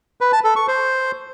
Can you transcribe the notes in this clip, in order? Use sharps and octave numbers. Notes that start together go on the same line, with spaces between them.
B4
A5
A4
C#6
C5